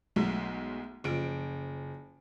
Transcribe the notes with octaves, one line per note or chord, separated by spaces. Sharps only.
B1 F#3 G#3 A3
F#1 F3 D7